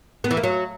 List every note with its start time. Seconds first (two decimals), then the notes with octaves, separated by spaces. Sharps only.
0.24 B3
0.31 E3
0.37 A#3
0.43 F#3